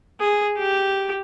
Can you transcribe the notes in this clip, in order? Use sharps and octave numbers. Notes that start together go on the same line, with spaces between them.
G#4
G4